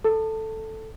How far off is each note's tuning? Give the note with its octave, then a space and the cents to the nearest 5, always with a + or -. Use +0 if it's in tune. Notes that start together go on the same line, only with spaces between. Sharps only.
A4 +0 A5 +20